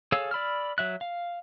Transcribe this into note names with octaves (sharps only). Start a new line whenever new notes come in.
G#4 A4 C#5 F5 E6
D5 B5 E6 F6
F#3 E5 F#6
F5